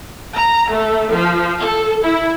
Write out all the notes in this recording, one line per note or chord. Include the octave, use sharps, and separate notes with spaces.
A#5
A3
F3
A4
E4